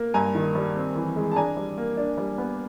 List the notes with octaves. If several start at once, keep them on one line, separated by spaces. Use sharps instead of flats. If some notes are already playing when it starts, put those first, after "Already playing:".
Already playing: A#3
G2 G#5 A#5
D#3
G3
C4
E3
G#3
A5
D4 G#5 A#5
G3
A#3
D4
G3
B3